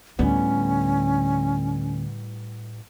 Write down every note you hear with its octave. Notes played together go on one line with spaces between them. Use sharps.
D2 A2 G3 B3 C#4